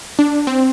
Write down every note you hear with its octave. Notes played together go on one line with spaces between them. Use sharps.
D4
C4